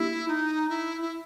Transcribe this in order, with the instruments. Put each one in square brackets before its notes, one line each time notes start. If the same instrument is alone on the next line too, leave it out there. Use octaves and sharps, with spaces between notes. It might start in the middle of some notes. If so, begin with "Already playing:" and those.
Already playing: [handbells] A#3 D4 G4 [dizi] E4
[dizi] D#4
E4
E4